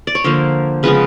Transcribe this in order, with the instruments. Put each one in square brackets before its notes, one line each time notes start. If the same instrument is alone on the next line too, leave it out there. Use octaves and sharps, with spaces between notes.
[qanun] D5
C#5
D3 F3 A#3 C5
C#3 F3 G#3 B3 B4